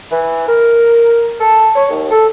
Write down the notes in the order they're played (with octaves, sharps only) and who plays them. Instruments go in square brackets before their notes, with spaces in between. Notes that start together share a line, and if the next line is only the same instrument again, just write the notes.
[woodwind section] E3
A#4
A4
C#5
D#2
A4